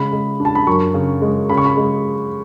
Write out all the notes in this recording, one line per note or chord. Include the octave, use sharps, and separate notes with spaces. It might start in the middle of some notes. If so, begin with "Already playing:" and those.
Already playing: C#3 G#3 B5
G#3
D4
A5
B5
F#2 C#6
C#3
G#3
C#3 B5
C#6
B5
G#3